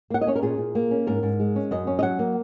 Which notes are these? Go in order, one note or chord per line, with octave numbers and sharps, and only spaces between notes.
A#3 F#5
D#5
C#4 C#5
A#4
A#2 G#4
A#2
A#3
C#4
G#2 A#4
G#2
G#3
C#4
F#2 D#5
C#4
D#5
F#3 F#5
A#3